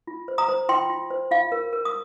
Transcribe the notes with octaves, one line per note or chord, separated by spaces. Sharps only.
F4
C5
A#5 D#6
C5
F4 G5 C6
F4
C5
F4 F5
A#4
A#4
D#6